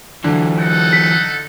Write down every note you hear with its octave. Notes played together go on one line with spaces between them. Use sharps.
D3 E3 F#3
D#4 A4 F#5
B6